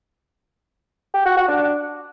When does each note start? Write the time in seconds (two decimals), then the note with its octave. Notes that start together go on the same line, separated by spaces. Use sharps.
1.14 G4
1.25 F#4
1.37 F#4
1.48 D4